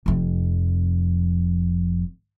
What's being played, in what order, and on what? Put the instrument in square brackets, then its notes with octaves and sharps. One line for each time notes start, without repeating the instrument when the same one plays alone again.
[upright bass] F1 F2